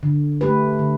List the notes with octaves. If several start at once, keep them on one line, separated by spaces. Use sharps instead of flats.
D3
A3 G4 B4
D3